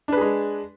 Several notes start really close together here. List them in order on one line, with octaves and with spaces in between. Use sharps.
D4 B4 G#4 G#3